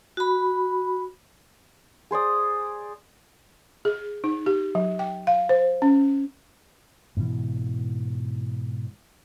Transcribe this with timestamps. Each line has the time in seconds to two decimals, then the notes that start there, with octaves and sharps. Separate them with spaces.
0.17 F#4 B5
2.11 G#4 C5 D5 D#6
3.85 G#4
4.24 D#4
4.46 G4
4.75 F#3
4.99 G5
5.27 F5
5.49 C5
5.82 C#4
7.17 G#2 B2 E3